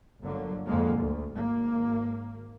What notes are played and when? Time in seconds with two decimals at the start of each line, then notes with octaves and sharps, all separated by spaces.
0.22 G1 D3 F#3 A#3
0.65 F2 D3 G#3 A#3
0.98 D2
1.33 G#1 A#3